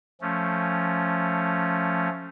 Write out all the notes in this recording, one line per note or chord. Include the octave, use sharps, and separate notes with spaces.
F3 A3 C#4